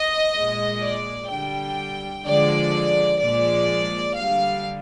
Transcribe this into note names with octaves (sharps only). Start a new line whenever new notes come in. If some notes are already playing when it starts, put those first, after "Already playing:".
Already playing: D#5
A#2 G#3
D5
D3 G3 G5
D3 F3 G#3 D5
A#2 F3 G#3 D5
D3 G3 F5